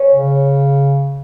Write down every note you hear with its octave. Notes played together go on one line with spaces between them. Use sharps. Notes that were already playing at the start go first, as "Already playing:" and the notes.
Already playing: C#4
C#3